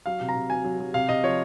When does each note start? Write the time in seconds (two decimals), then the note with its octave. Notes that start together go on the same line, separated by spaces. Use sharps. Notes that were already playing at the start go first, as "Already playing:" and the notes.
0.06 F#3 F5
0.20 C3
0.29 A#5
0.35 C3
0.50 F#3 G#5
0.64 F#3
0.80 F#3
0.94 C3 F5
1.09 C3 D#5
1.24 F3 C#5